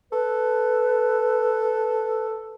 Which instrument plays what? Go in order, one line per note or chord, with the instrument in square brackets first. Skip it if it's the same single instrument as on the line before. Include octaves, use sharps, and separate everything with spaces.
[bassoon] A4 [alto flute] B4